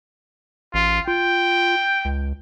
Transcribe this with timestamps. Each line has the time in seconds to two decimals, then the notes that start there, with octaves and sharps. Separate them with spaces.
0.74 A1 F4
1.08 F4 G5
2.05 C#2